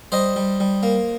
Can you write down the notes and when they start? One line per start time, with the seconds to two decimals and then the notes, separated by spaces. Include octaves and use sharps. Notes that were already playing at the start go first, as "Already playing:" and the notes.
0.12 G3 C5 D#5
0.36 G3
0.60 G3
0.83 A#3